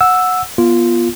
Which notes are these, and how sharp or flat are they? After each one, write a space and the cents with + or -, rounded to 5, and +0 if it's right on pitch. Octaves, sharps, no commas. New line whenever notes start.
F#5 -15 E6 +0
B3 -35 F4 -10